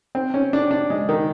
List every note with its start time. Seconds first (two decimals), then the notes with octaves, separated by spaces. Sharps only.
0.15 C4
0.34 C#4
0.53 D4
0.71 D4
0.90 G#3
1.09 D#3